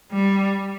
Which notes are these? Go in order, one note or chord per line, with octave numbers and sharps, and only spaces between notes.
G3